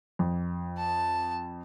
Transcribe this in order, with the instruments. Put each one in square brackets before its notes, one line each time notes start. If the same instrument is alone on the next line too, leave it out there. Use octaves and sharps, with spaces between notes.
[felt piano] F2
[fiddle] A5